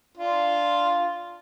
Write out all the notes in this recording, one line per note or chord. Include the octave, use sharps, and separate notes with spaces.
D4 F4